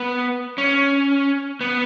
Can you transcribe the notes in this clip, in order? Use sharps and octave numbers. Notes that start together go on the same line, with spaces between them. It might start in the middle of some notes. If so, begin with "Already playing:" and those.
Already playing: B3
C#4
B3